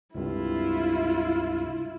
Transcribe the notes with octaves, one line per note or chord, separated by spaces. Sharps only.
C#2 G2 C3 E4 F4